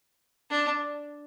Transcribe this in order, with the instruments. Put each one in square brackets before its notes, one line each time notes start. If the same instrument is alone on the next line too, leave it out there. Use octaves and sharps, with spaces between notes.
[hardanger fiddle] D4